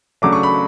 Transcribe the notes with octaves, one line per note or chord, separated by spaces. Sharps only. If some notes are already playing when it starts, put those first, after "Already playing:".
C#3 F#3 A3 D4 D6
C#6
B5